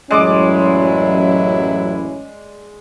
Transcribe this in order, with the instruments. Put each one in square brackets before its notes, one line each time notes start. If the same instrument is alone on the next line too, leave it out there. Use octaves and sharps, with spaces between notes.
[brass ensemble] A1 F#2 E4 [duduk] F#3 [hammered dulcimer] G#3 D5 D6 [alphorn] C#4